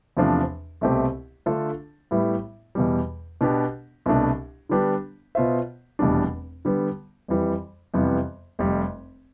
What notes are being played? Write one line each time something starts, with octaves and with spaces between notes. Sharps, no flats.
E2 C3 F3 A3 D4
C2 B2 A3 C4 G4
D3 A3 D4 F4 A4
A2 G3 B3 E4
E2 B2 G3
B2 B3 D4 G4
C2 B2 A3 D4
D3 G3 B3 D4 G4
B2 B3 F4 C5 E5
F1 E2 B2 G3 D4
D3 G3 B3
F2 E3 G3
F2 C3 E3 G3 B3
F1 F2 C3 G3